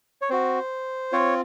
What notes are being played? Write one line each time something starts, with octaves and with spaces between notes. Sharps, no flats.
C#5
C4 F#4 C5
C4 F4 C#5